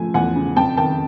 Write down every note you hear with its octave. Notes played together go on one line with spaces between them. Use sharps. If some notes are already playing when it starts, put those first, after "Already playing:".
Already playing: C#3 F3 A3 G#5
E2 F#5 G#5
C#3
F2 G5 A5
D#3 G5 A5